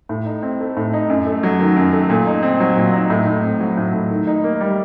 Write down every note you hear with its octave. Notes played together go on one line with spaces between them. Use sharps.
A2
D#4
C4
A3
A2
D#4
F#2
A3
F#3
D#3
F#2
A3
A#2
D#4
C4
F#3
A#2
D#4
A2
A2
C4
F#3
A2
A2
D#3
D#4
A#3
G3